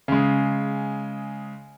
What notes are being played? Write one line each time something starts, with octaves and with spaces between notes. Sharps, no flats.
C#3 G#3